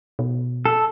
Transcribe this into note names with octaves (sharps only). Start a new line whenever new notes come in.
B2
A4